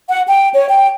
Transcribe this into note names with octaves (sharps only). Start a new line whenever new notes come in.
F#5
G5
C#5
G5